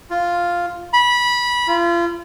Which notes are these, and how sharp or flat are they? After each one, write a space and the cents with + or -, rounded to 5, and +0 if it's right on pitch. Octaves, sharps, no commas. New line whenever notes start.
F4 +0
B5 -20
F4 -35